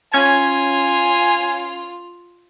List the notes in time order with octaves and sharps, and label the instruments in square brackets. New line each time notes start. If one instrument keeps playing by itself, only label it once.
[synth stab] C#4 G#6 [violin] F4 [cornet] G#5